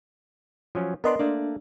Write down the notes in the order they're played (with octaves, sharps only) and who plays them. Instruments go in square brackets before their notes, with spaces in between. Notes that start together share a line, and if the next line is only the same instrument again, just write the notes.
[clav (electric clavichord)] F3 F#3 C#4
[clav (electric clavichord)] B3 D4 D5 [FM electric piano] A#4 D#5 C6
[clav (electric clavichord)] A3 A#3 D5 [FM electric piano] D4